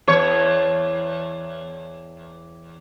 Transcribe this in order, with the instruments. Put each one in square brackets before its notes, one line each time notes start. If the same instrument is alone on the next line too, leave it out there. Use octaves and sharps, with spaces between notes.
[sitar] E2 C#5